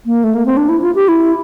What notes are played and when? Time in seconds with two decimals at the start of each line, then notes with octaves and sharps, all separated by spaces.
0.06 A#3
0.24 A3
0.35 A#3
0.46 C4
0.57 D4
0.69 E4
0.82 F4
0.95 G4
1.08 E4